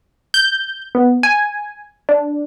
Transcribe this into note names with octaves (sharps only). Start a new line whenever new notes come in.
G6
B3
G#5
D4